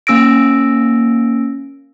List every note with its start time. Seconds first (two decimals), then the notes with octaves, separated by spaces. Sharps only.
0.07 A#3 C#4 E6 A#6 D7